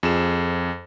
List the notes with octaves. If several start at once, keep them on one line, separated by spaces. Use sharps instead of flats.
F2 G#4 E7